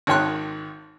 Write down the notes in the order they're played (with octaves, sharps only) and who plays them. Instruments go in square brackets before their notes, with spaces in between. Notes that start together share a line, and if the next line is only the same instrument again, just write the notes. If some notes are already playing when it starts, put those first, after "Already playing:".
[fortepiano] G#1 D#3 C#5 G5 C6 F#6